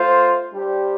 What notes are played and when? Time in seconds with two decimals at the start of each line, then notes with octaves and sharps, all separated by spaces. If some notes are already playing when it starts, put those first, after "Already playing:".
Already playing: A3 F4 C5
0.52 G3 D4 G4 C5